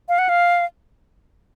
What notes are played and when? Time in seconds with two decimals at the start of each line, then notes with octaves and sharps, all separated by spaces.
0.09 F5
0.19 F#5
0.29 F5